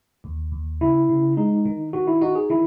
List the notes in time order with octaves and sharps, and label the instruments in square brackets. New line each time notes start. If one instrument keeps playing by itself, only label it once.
[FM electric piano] D#2
D#2
[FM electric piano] C#3 [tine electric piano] E4
[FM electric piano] C#3
[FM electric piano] G#3 [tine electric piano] D#4
[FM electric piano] D#3
[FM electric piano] D#3 [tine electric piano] F#4
[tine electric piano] E4
[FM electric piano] D#4 [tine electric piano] F#4
[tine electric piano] G#4
[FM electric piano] D#3 [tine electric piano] E4